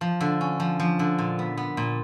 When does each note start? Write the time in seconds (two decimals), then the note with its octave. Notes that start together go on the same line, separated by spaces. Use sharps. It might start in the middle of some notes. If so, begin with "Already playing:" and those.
0.01 F3
0.21 D3
0.41 C#4
0.60 F3
0.79 F3
0.99 D3
1.18 A#2
1.39 B3
1.57 B3
1.77 A#2